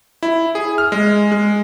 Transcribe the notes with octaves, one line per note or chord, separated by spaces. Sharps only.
E4
G#4
F6
G#3
G#3